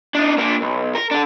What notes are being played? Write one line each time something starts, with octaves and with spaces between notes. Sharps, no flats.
D4 D#4
A#3 D4
B1
A#4
D4 A4